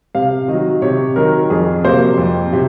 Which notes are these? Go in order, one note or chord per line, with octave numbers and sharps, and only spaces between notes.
C3 F5
D#3 F#3 D#5
C3 C#5
D#3 F#3 A#4
F2 G#4
C3 F#3 A#3 C5
F2
C3 F#3